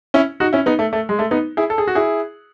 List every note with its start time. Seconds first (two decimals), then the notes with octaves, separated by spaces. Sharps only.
0.14 C#4 E4
0.40 D#4 F#4
0.53 C#4 E4
0.66 B3 D#4
0.79 A3
0.93 A3
1.09 G#3
1.19 A3
1.31 B3 D#4
1.57 E4 G#4
1.70 A4
1.78 G#4
1.87 F#4
1.95 E4 G#4